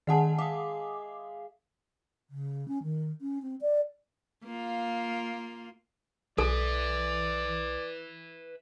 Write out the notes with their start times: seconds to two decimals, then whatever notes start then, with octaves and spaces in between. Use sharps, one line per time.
0.07 D#3 G#3 G#4 F#5 A5
0.38 E5 F5 D6 D#6
2.30 C#3
2.68 C#4
2.83 D#3
3.21 C#4
3.42 C4
3.61 D5
4.44 A#3 F4
6.38 B1 A4 B4 D5 E5